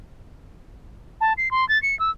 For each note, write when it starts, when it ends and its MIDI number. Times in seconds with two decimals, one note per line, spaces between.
1.21 1.33 81
1.37 1.51 96
1.51 1.67 84
1.69 1.81 93
1.82 1.97 97
1.99 2.10 88